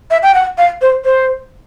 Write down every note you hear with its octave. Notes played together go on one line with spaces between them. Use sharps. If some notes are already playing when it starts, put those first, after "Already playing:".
E5
G5
F#5
F5
C5
C5